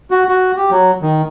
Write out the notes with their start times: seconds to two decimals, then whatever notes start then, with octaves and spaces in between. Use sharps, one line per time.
0.11 F#4
0.28 F#4
0.56 G4
0.71 F#3
1.02 D#3